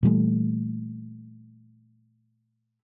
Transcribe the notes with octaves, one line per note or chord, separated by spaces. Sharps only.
A#2 E3 G3 A3